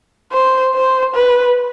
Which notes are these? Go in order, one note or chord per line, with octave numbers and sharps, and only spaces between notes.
C5
C5
B4